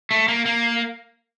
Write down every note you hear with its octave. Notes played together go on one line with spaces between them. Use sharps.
A3
A#3
A#3